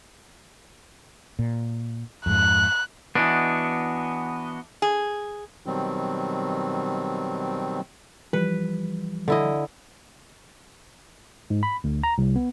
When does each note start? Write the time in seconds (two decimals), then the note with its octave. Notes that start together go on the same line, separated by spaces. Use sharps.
1.39 A#2
2.26 F2 G#2 F#6
3.15 E3 B3 D4 F#4 D#5
4.82 G#4
5.66 B2 D#3 F#3 G3 C4
8.33 E3 F3 G3 B4
9.28 D3 E4 D#5
11.50 G#2
11.63 B5
11.84 D2
12.04 A#5
12.18 C2
12.36 B3